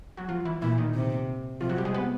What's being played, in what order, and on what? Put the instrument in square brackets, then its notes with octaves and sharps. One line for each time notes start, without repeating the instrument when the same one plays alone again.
[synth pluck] F#3 F#4
F3 F4
E3 E4
[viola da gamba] A#2 [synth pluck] E3 E4
[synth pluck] D#3 D#4
[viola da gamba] C3
[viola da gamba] C3 [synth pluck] F3 F4
[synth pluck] F#3 F#4
G3 G4
G#3 G#4
B3 B4